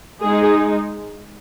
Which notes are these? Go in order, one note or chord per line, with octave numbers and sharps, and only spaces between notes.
G#3 D#4 G#4